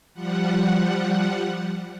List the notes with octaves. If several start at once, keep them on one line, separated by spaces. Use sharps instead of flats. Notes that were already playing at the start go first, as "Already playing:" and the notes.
F3 G3 F#5